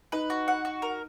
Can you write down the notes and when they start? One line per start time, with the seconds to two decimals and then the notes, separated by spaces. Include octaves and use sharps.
0.12 D#4 B4
0.30 F#4
0.48 F#5
0.65 F#4
0.82 A#4